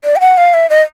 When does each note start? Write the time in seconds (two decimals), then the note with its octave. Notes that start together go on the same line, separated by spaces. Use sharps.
0.04 D5
0.16 G5
0.21 F#5
0.37 F5
0.54 E5
0.70 D#5